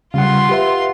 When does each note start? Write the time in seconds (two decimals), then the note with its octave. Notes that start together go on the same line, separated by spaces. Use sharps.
0.14 C#3 G3 F4 F5 F#5 C6
0.49 G4 B4 E5